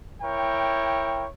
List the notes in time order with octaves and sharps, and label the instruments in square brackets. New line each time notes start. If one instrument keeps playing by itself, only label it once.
[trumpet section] E4 A#4 C#5 G5